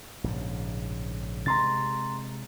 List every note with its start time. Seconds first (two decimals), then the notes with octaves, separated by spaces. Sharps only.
0.24 A#1 G#2 C#3
1.46 C3 G#3 A#5 C6 A6